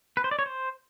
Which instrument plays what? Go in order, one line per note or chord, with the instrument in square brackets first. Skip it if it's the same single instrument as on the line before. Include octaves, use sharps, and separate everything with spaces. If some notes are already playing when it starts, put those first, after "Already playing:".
[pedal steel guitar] B4
C5
D5
C#5
C5